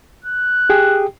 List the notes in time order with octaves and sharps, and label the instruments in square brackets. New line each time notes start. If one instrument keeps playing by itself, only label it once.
[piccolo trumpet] F#6
[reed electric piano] G4 G#4 G5